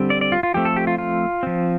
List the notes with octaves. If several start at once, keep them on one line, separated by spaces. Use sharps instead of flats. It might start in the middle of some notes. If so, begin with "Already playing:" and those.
Already playing: D3 G3 C4
D5
D5
F4
F4
F3 A3 C4 G4
A4
G4
F4
F4
F3 C4